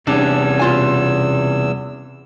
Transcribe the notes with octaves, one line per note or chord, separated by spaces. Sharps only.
E2 C3 G3 C#4 D4 E6
B2 F4 G#5